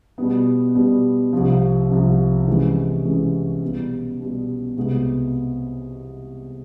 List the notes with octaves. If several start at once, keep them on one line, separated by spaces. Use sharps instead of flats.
B2 G3 B3
B2 G3 B3
C2 C3 F3
C2 C3 F3
C3 E3 G#3 C#4
C3 E3 G#3 C#4
B2 G3 B3
B2 G3 B3
C2 B2 G#3 B3